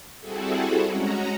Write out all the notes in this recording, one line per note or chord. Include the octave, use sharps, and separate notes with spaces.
G3 C4 E4 F#4 G#4 A4
G#3 C#4 F#4 A#5